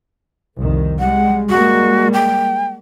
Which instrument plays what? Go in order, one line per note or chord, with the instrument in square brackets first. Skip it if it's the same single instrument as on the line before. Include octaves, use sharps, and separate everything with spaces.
[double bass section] C2 F2 D#3
[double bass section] G3 G#3 [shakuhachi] F#5
[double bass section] G3 G#3 A#3 [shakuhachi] F#4
[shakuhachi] G5